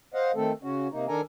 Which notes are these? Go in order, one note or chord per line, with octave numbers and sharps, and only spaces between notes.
C5 D#5 F5 F#5
D#3 A3 C4 A4
C#3 C#4 F#4
C3 A#3 D#4
D#3 D4 A4 A#4 G#5 A#5